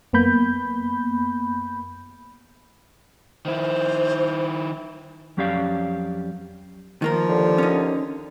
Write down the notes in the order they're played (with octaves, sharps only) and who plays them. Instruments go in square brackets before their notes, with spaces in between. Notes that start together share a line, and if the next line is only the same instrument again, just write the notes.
[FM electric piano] F#2 A#3 B3 B5 G6
[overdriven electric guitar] D#3 E4 [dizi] C5
[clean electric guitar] F2 F#3 C#4 G4 D5 F5
[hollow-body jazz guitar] D#3 A#3 A#4 [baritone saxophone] F3
[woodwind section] D#2 D3
[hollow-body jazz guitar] C#4 D#4